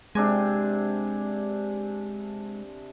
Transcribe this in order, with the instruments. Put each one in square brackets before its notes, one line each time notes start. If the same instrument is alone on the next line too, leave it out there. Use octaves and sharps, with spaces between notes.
[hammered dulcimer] C3 D4 G#5 [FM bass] G#3